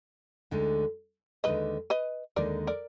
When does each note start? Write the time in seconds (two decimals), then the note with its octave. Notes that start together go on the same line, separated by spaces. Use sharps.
0.51 D2 D3 G#3 D#4
1.44 D#2 D3 G#3 D#4 B4 D#5
1.90 B4 D#5
2.36 D#2 D3 G#3 D#4 A#4 D5
2.67 A#4 D5